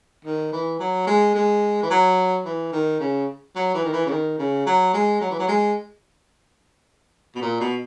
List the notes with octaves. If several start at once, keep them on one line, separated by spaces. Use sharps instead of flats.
D#3
E3
F#3
G#3
G#3
E3
F#3
E3
D#3
C#3
F#3
E3
D#3
E3
C#3
D#3
C#3
F#3
G#3
F#3
E3
F#3
G#3
B2
A#2
B2